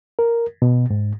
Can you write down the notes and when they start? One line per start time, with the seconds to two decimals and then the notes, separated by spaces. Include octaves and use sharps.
0.19 A#4
0.62 B2
0.90 G#2